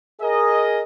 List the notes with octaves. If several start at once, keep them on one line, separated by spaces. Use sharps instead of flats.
G#4 A#4 D#5